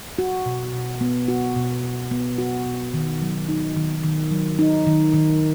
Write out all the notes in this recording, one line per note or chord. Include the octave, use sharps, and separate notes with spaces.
F#4
B2
B2
B3
F#4
B2
B2
B3
F#4
B2
D#3
F#3
D#4
D#3
D#3
F#3
D#4
D#3
D#3